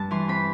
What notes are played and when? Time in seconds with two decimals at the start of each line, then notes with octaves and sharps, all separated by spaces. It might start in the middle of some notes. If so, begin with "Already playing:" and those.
Already playing: G2 A5
0.11 E3 C6
0.28 C4 B5